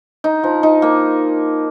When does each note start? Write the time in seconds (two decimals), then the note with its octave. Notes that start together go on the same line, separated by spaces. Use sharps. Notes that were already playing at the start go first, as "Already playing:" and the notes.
0.24 D#4
0.43 F3
0.63 D#4
0.82 A#3